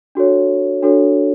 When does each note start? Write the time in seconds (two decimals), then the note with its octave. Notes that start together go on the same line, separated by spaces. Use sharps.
0.15 D4 F#4 A4 C#5
0.83 D4 F#4 A4 C#5